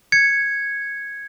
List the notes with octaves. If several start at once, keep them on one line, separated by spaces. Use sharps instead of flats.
G#6 C#7